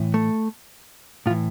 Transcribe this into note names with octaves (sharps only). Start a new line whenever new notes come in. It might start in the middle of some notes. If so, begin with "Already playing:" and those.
Already playing: A2 E3
A3
A2 E3 F4